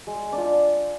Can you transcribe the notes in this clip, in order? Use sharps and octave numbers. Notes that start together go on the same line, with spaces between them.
G#3
D4
F4